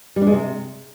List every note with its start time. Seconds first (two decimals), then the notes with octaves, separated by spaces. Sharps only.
0.16 G3
0.22 D4
0.27 G#3
0.32 C3